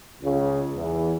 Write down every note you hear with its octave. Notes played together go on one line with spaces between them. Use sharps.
C#2 C#3
E2 E3